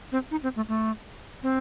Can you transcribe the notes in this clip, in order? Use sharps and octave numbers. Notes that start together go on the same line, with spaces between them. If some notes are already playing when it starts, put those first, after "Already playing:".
C4
D#4
C4
A3
A3
C4